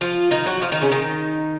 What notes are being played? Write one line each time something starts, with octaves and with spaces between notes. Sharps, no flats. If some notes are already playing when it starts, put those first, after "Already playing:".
F3 F4
D#3 D#4
F#3 F#4
F3 F4
D#3 D#4
C#3 C#4
D#3 D#4